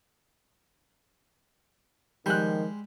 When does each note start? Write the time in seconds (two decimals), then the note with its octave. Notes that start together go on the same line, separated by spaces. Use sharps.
2.26 D#3 F3 G3 G#3 C6 F#6